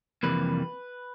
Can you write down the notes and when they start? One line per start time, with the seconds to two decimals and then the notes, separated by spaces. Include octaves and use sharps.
0.23 F2 C3 E3 G3 A#3 B4